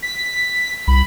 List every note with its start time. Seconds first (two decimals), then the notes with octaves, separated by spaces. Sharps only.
0.02 B6
0.87 C2 B5